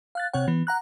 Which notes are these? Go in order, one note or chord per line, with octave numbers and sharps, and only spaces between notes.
F5 F#6 A6
C3 C4 C#5 F#5
E3 B3
F#5 A#5 F#6